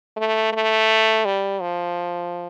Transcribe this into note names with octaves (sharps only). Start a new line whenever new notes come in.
A3
A3
G3
F3